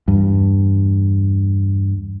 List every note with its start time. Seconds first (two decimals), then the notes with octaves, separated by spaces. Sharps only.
0.08 E2 G2